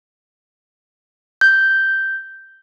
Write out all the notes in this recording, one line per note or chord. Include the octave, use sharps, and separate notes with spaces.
G6